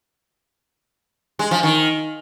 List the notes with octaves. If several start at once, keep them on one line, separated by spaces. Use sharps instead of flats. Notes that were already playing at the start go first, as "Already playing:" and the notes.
G#3
F3
D#3